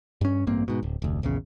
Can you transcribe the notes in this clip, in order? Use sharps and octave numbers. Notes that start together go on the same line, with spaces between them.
G2 C#4
A1 G2 A#3 C4
G#2 B2
D1
F1 D2
A#1 E2 C#3